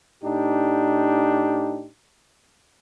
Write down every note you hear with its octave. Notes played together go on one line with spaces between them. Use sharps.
A2 D4 D#4 G4